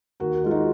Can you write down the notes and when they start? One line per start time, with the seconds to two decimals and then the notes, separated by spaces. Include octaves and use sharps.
0.20 D#2 F#4 A#4
0.44 G#3 F4
0.51 D#4 F#4